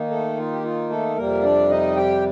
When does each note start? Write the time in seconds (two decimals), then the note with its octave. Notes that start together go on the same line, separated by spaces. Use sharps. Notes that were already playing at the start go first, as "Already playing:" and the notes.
Already playing: D#3 A#3 D#4
0.10 A3 A4
0.37 F4
0.52 G4
0.63 F4
0.90 A3 A4
1.16 F2 C3 G3 A#3 A#4
1.43 D4 D5
1.70 D#4 D#5
1.96 G4 G5